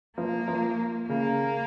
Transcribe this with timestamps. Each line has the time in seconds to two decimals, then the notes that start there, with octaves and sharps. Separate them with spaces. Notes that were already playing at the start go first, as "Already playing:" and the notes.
0.17 F3 A#3
0.48 F3
1.08 C#3 A#3